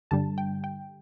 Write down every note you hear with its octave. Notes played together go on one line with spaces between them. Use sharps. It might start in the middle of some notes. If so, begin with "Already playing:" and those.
G2 D3 G3 A5
G5
G5